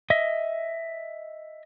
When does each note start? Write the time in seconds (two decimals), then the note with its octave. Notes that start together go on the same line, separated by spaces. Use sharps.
0.10 D#5 E5